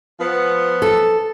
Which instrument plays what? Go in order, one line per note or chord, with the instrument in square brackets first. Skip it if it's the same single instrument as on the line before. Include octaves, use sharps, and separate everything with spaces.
[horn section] F3 B3
[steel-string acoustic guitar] A4